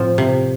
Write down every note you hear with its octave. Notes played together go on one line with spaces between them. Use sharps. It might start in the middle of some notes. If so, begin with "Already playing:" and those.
Already playing: A2 F3 C4
C3